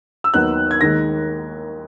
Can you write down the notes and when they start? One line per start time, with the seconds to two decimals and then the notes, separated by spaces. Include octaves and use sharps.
0.24 E6
0.34 D#2 D#3 F#3 B3 F#6
0.71 G#6
0.81 D#2 D#3 G#3 A#6